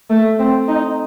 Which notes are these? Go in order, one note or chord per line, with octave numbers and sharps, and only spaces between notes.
A3
C4
D#4